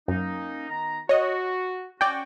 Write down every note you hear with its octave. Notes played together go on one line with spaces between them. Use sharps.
F#2 A#3 C#4 D#4
D#3 B3 A#5
F#4 C#5 D#5
C#4 F#4 D5 G5